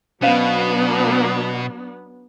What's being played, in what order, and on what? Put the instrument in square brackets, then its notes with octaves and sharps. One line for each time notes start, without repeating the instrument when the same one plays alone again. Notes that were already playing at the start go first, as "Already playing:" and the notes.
[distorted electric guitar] B2 [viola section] F#3 B3 D4 [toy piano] C#4 C5 F5